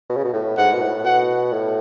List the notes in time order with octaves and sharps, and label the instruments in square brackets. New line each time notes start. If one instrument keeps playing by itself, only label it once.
[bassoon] B2
C#3
B2
A2
[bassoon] G#2 [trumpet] F#5
[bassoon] B2
A2
[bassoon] B2 [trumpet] F#5
[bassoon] A2